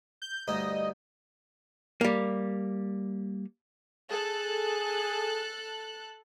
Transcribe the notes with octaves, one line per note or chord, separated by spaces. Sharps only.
G6
D2 G2 D#4 D#5
G3 A#3
G#4 A4 F#6